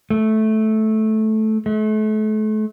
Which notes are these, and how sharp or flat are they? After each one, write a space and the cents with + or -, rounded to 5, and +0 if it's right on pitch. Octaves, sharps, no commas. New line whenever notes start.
A3 -10
A3 -35